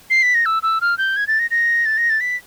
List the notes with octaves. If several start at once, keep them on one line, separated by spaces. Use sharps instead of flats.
C7
B6
A#6
E6
E6
F6
G6
G#6
A6
A#6
A#6
A6
A#6
A6
B6